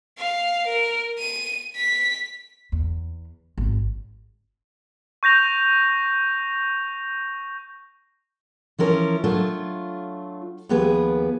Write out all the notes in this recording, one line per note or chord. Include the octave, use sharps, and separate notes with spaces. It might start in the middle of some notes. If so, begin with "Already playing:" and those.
F5
A#4
D#7
B6
E2
G#1
C#6 G6 A#6 F7
E3 F3 C#4 A#4
F#3 A3 D4 F4
D#2 F3 B3 G4 G#4 B4